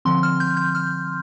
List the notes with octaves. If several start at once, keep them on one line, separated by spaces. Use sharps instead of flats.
D3 F3 C4 C6
F6
G6
G6
F6